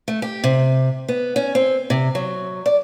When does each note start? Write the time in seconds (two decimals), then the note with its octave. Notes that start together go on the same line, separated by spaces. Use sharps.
0.08 A3
0.22 G4
0.44 C3
1.08 B3
1.36 C#4
1.55 C4
1.90 C3
2.15 F#3
2.66 D5